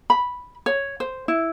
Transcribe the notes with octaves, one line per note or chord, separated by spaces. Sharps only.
B5
C#5
C5
E4